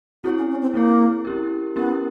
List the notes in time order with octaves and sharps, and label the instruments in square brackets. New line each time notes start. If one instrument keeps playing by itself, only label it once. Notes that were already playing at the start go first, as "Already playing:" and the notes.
[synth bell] C4 E4 G#4 C#5 [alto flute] F#4
[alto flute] C#4
C#4
C4
[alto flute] A#3 [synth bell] C4 E4 G#4 C#5
[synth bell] C#4 E4 G4 A#4
[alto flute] B3 [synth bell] C#4 E4 G4 A#4